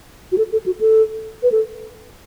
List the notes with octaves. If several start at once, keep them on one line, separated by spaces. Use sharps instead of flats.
F#4
A4
A4
F#4
A4
B4
A4